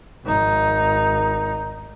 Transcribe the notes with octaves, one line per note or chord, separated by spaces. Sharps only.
G#1 D#4